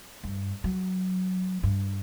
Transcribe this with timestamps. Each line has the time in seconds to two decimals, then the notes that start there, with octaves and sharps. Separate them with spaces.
0.24 G2
0.64 F#3
1.63 G2